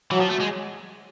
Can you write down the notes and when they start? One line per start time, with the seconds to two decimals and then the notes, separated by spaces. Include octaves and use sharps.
0.11 E3 F#3
0.20 F3
0.29 A3
0.40 G#3